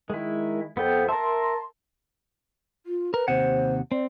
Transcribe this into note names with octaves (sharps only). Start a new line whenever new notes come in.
D#3 G#3 E4
F2 B3 A4 G5
A#4 E5 A5 C6
F4
A#4 B4
D#2 C3 C5 F#5
C4 D5